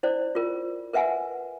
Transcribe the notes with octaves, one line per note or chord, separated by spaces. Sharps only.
E4 C5 D5
F4 A#4
A#4 B4 E5 F#5 G#5